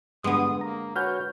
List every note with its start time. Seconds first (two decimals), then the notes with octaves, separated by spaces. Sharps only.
0.24 G2 D3 G#3 B3 D#6
0.61 A#3 A#5
0.96 F#4 B4 C#5 G#5 F6 G6